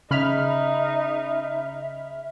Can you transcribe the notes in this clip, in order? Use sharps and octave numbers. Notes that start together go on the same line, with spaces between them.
C#3 D#4 E5 B5 F6